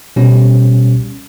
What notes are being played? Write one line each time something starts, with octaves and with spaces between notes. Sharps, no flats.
B2 G3 C#4 G4